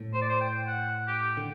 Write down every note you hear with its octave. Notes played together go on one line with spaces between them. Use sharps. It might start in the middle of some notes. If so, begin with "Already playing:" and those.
Already playing: A2
C5
D5
C5
G5
F#5
G4
D3